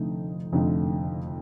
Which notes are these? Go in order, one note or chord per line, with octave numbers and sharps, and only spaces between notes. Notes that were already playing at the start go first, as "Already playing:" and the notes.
Already playing: F1 F2 D3 A3 D#4
F1 F2 D3 A3 D#4